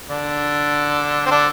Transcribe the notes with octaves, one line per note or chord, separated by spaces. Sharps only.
D3 D4
C4
D3 D4